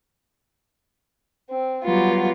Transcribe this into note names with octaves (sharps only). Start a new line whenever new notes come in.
C4
F#3 G3 B3 F4